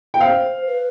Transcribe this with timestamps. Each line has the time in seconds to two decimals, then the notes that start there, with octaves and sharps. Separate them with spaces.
0.14 G5
0.20 C5 F5
0.67 B4